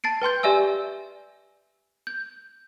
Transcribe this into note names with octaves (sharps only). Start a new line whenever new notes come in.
A5 A6 C7 D7
B4 G5 C6 G6
G4 D5 E5 G#5 E6
G6